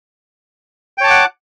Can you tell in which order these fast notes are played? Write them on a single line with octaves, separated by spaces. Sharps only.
G5 C#5 A5 D6 F#5